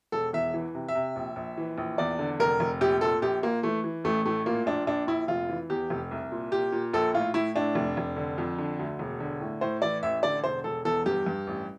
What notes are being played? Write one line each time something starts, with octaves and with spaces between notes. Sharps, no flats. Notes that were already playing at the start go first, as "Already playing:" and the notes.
E1 A4
E2 E5
E3
C3
E5
C3
A#1
A#1
E3
A#1
E2 D5
D3
F1 A#4
F1
A#1 G4
A#2 A4
A#1 G4
A#2 A#3
E3 A3
E3
A1 A3
A2 A3
A#2 A#3
A#1 D4
A#1 D4
A#1 E4
F1 F4
E3
E2 G4
F1
C2
A#2
A#2 G4
A#2
A#1 A4
A2 F4
A2 E4
A2 D4
F1
F1
D3
F2
D3
D2
E1
D3
A2
A2 C5
E3 D5
A1 E5
D3 D5
E1 C5
E1 A4
E2 A4
G2 G4
G2
A1